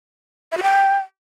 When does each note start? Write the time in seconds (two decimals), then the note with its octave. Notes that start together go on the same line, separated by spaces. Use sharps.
0.52 E5
0.57 F#4
0.63 G5